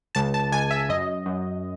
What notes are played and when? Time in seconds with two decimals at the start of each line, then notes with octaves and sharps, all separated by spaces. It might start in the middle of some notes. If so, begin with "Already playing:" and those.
0.15 C#2 A5
0.34 A5
0.52 C#2 G#5
0.71 E5
0.89 F#2 D#5
1.26 F#2